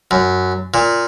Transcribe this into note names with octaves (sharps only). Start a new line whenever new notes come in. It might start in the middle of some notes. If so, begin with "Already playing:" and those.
F#2
A#2